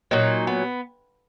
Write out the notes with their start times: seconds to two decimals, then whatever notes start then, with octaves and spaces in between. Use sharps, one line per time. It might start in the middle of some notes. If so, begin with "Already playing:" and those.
0.11 A#2 F#3 D#4
0.47 B3